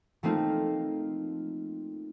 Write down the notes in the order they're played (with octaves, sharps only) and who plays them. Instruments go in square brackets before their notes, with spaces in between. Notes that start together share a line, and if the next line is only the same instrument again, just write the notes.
[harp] F3 A3 A#3 C4 D#4 F4